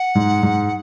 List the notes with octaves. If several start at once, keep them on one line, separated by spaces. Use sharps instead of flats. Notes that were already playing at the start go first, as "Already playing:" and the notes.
Already playing: F#5
G#2
G#2